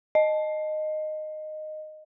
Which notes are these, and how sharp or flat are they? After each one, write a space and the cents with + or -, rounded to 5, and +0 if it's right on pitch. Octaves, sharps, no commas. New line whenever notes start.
D#5 -10